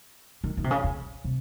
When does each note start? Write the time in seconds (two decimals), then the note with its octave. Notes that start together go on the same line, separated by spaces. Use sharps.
0.44 D#3
0.57 D#3
0.64 C3
0.71 C#3
0.84 C#3
1.24 C3